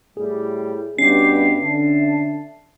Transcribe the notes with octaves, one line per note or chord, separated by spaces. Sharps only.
A2 G3 G#4
G2 B2 C#4 G4 C7
D3 E5 A5